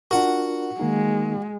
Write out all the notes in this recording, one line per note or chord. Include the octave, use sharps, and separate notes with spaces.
D4 F4 F#4 A#4 F#5
D#3 G#3 A#3 D#4